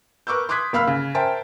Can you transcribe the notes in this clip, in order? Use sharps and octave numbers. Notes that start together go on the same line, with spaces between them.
A#4 B4 C#6 D6 E6 G6
C6 D6 D#6 F#6 G#6 B6
F#1 F5 B5 E6 F6 B6
C#3
A#4 C5 E5 G5 A5